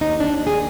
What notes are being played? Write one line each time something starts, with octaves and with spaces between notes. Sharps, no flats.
D#2 D#4
D4
D#2
G#4